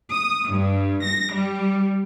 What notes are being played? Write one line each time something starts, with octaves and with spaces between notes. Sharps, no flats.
D#6
G2
A#6
G3